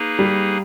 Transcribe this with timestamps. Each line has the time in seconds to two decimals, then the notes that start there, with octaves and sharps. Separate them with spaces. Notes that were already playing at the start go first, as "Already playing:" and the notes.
Already playing: A#3 D#4 G#4 B4
0.19 G3